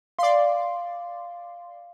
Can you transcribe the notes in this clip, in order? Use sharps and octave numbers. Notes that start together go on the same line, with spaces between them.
D5 F5 C6